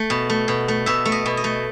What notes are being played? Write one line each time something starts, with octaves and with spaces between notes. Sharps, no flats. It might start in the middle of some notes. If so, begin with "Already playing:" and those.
Already playing: A3
B2
A3
B2
A3
B2 E5
A3
D#5
B2
D#5
A3